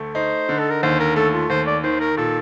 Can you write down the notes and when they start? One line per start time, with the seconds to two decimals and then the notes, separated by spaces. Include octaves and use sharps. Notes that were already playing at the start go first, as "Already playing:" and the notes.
Already playing: D2 A3
0.15 D#4 C5
0.49 D3
0.58 A4
0.70 A#4
0.83 D#2 C5
1.00 A#4
1.16 A3 A4
1.34 F4
1.50 D#2 C5
1.67 D5
1.84 D#3 C5
2.00 A#4
2.17 A#2 A4